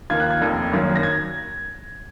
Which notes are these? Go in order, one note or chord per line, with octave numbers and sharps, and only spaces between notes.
D#2 D#3 A#3 F4 G#6
F#6
G#6
F1 D#2 D#3
G#1 F#2 D#3 F#3 A#3
A#6
G#6